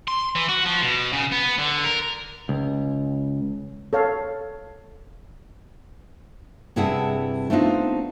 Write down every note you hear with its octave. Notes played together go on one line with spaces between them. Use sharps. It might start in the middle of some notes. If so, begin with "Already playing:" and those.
C6
E3
F#4
F3
B2
C#3
B3
D3
A#4
C#2
A4 C#5 F5
G2 C3 E4 G#4 F#5 A5
A3 B3 C4 D4 D#4 F4